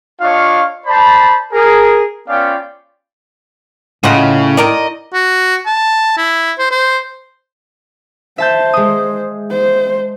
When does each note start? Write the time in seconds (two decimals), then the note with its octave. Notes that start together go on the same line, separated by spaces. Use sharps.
0.21 D4 F4 C#5 D#5 F5 C#6
0.85 C5 D5 A5 B5
1.52 G#4 A#4
2.28 B3 C#4 F4 D5 F5 G5
4.03 A2 C#3 F4 D#5 F#5
4.57 D#3 A#4 D5 D#5
5.14 F#4
5.66 A5
6.17 E4
6.59 C5
6.71 C5
8.38 C5 E5 A5 G6
8.73 G#3 D#6
9.50 C5